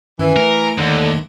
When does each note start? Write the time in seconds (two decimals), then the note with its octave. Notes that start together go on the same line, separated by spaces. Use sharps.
0.19 G2 D#3 E3 C#4
0.36 A3 A#4
0.77 D#2 D3 D#3 A3